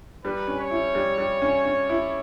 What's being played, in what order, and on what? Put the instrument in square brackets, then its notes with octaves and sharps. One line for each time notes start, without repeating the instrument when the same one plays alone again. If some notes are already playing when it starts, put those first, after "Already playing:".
[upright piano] G3 [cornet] B4
[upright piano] C#4
[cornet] C#5
[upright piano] E4
G3
G3
C#4
C#4
E4